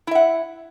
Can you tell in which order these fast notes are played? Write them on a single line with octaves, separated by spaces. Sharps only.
E4 E5 F#5